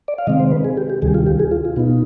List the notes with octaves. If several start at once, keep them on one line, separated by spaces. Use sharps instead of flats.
D5
F5
C3 D#3 G#3 C4 D#5
C5
B4
G#4
G4
G4
D2 C3 D#3 G3 G#4
F4
G4
G#4
F4
F4
B2 B3 D#4 F4